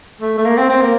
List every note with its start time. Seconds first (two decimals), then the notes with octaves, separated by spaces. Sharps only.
0.21 A3
0.38 A3
0.45 A#3
0.57 C4
0.69 C4
0.81 A#3